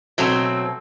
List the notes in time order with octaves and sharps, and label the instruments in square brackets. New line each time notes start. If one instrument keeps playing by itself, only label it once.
[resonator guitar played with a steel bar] B2 F#3 A3 C4